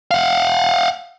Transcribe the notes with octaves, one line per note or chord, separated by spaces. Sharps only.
F5 F#5